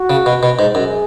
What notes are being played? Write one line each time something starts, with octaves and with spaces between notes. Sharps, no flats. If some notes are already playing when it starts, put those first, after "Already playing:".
Already playing: F#4
C#3
B2
B2
G#2
F#2 G#4